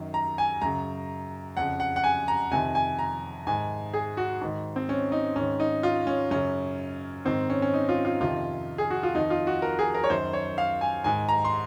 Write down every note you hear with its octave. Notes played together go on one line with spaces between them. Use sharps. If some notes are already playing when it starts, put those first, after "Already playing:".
Already playing: F#2 D#3
A#5
G#5
F#2 C#3 A#5
F2 C#3 F#5
F#5
F#5
G#5
A#5
F2 C3 D#3 G#5
G#5
A#5
G#2 D#3 G#5
G#4
F#4
G#2 D#3
C4
C#4
D#4
G#2 D#3 C#4
D#4
F4
C#4
F#2 C#3 C#4
G#2 D#3 C4
C#4
C#4
D#4
F4
F4
F2 C3 D#3 F4
G#4
F#4
F4
F2 D#3 D#4
F4
F#4
A#4
G#4
A#4
C#5
F#2 D#3 C5
C#5
F5
G#5
G#2 D#3 G#5
A#5
C6